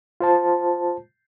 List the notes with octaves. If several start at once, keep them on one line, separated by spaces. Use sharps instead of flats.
F4 C5 A5